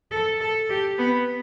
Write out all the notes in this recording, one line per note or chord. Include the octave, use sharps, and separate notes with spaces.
A4
A4
G4
B3